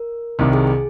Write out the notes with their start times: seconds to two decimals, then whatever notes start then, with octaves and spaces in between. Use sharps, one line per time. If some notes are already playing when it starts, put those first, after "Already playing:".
Already playing: A#4
0.39 C2 C3 D#3
0.53 G#4
0.67 G#4